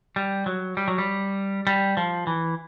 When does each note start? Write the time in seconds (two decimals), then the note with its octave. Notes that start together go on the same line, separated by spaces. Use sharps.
0.16 G3
0.46 F#3
0.77 G3
0.88 F#3
0.98 G3
1.67 G3
1.97 F3
2.27 E3